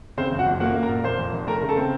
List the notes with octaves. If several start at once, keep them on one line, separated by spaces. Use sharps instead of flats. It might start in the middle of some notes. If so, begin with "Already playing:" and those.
C#3 C4 C5
F#1
F#4 F#5
F#1
A#3 F#4 F#5
A#3
A#4 A#5
A#2
F1 C5 C6
F2
F1
A3 A#4 A#5
C#3
A4 A5
C4